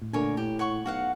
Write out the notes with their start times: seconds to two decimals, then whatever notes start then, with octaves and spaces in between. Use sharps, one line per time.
0.02 A2
0.13 A#2 D3 A3 A#4 C#5 G#5
0.37 A2 G4
0.59 C#5 F#5 C#6
0.86 B1 F#4 F5 F#5